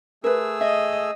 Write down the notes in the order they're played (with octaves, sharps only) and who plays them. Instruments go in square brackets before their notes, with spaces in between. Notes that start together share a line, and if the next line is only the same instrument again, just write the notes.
[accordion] A3 G#4 E6 [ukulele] A#4 B4
[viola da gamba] D#5 [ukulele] E5